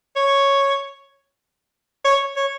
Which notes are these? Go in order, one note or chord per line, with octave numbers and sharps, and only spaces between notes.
C#5
C#5
C#5